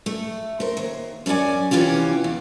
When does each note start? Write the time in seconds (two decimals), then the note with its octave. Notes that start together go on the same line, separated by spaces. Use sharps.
0.06 A3
0.60 A#4 C5
0.77 D#2
1.26 F#2 C#4 G#4 D5 G#5
1.71 C3 E3 C#4 F4 G4
2.24 E2